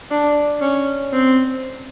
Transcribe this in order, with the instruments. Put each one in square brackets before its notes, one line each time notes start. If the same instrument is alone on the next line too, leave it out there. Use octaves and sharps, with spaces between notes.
[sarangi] D4
C#4
C4